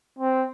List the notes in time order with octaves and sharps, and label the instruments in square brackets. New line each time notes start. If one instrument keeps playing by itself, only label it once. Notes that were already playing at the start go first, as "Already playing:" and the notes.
[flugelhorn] C4